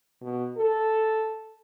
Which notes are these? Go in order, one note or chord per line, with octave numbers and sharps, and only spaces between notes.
B2
A4